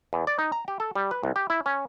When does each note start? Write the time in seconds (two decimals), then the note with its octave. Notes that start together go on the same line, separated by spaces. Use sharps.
0.13 E2
0.27 D5
0.39 D#4
0.52 A#5
0.68 G4
0.80 A4
0.95 G3
1.11 B4
1.23 C2
1.36 G4
1.50 E4
1.66 C#4